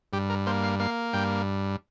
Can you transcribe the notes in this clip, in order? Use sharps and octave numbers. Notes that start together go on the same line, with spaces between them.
G2 G4
A#4
A#3 C5
F5
A#3 F5
G2 G5